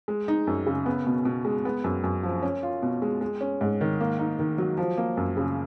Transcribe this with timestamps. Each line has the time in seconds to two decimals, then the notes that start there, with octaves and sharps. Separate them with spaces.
0.08 G#3
0.28 D#4
0.47 F#2
0.66 C#3
0.86 B3
1.07 B2
1.25 B2
1.45 G#3
1.65 B3
1.84 F#2
2.04 F#2
2.23 F3
2.43 C#4
2.63 F4
2.82 B2
3.02 G#3
3.21 G#3
3.41 C#4
3.61 G#2
3.81 D#3
4.00 A#3
4.19 D#4
4.39 D#3
4.58 F#3
4.78 F3
4.97 A#3
5.17 F#2
5.37 C#3